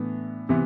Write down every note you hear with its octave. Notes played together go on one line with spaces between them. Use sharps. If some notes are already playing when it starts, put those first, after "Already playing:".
Already playing: A2 E3 B3 D4
C3 E3 B3